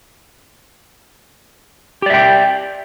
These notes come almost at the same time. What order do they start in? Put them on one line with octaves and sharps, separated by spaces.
G4 D5 E5 G5